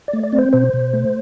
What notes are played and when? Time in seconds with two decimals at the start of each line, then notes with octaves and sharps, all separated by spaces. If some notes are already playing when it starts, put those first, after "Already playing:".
0.08 D5
0.13 A3
0.23 D5
0.33 C4
0.38 C5
0.53 B2 C5
0.73 B2
0.93 A3